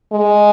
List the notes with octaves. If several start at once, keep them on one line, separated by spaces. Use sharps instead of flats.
G#3